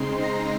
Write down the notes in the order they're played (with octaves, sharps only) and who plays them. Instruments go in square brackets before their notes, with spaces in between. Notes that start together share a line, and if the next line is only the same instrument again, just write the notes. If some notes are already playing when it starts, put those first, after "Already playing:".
Already playing: [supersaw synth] C#3 G#3 C4 D#4 C6 C7
A#5 A#6